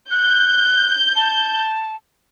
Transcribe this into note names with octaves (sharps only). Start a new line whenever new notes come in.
F#6 G6
A5